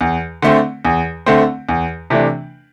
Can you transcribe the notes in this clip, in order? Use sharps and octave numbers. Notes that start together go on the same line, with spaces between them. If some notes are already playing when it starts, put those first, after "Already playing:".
E2
D3 A3 C4
E2
D3 A3 C4
E2
C3 E3 A3 D4